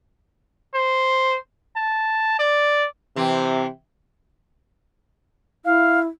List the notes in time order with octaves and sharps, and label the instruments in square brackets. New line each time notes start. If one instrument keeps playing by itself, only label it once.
[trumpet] C5
A5
D5
[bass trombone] C3 [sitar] E3 C4
[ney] E4 [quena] F5